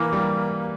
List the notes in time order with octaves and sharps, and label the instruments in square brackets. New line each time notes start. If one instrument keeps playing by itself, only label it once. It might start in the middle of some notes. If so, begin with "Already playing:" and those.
Already playing: [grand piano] E3 [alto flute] A#3
[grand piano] G3